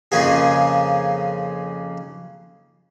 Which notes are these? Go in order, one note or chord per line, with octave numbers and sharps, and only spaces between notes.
F2 C#3 A#3 G#4